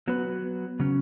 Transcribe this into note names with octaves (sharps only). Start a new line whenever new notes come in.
F#3 B3 F#4 B4
C#3 F#3 C#4